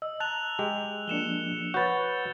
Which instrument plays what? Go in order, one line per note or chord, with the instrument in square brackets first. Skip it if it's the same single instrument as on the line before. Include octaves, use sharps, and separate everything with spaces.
[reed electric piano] D#5 [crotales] E6
[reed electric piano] A5 A#5 [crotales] F#6 F7
[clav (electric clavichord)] G#3 G4
[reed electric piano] F3 A#3 D4 [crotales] C#7 E7 G7
[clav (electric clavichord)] F#4 B4 [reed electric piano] C#5 F#5 [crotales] G6 A6